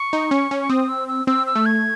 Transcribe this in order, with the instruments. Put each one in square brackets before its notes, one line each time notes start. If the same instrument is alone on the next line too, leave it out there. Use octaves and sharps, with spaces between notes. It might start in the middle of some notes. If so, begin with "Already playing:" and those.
Already playing: [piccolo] C#6
[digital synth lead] D#4
C#4
C#4
[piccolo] C#6
[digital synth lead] C4 [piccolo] D#6
[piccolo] E6
E6
[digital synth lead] C4 [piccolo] E6
[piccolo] E6
[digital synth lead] A3
[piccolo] G#6